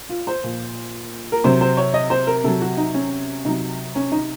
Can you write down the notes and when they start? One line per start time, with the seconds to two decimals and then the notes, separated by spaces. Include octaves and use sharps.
0.09 F4
0.27 C5
0.43 A#2 F3
1.32 A#4
1.44 C3 F#3 C5
1.61 C5
1.77 C#5
1.94 D#5
2.10 C5
2.27 A#4
2.44 C3 F#3 A4
2.62 F#4
2.77 D#4
2.94 C#4
3.45 C3 F#3 D#4
3.95 C#4
4.12 D#4